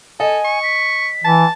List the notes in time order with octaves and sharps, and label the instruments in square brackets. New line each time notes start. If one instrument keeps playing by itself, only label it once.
[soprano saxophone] A4 [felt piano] D#5 [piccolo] G#5
[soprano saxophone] C#6
[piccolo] B6
[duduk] E3 [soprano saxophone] A5